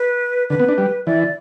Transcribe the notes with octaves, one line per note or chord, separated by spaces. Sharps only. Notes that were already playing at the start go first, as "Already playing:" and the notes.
Already playing: B4
D3 B4
B3
D4
G3
E3 D5